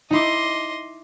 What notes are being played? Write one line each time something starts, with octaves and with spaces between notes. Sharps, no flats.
D#4 E4 D#5 C6 D6